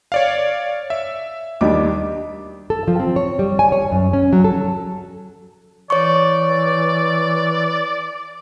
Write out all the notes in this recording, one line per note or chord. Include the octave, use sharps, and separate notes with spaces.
C#5 D5 F5
E5
D#2 G3 D4 D6
A4
F3
C4
C#5
G3
G#5
C#5
F#2
C#4
F#3
A4
E3 C#5 D5 C#6